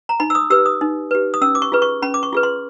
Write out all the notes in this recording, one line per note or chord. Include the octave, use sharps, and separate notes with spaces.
A#5
D#4 B5
E6
D#6
G4 B4 E6
D#6
D#4
G4 B4
D#6
C#4 E6
D6
C#6
F4 G#4 B4
C#6
C#4 B5
D6
C#6
F4 G#4 B4
C6